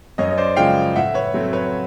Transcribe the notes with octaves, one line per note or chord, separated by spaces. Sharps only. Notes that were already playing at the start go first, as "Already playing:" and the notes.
F#2 C#5 D#5
D#5
C5 D5
C#3 F3 G#3 C#4 F5 G5
A2 E5 F#5
B4 C#5
F#3 A3 C4
B4 C#5